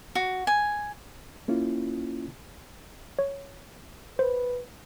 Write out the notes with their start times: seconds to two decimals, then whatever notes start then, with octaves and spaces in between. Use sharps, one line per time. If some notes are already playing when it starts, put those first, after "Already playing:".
0.15 F#4
0.47 G#5
1.48 A#3 C#4 E4 F4
3.19 C#5
4.19 B4 C5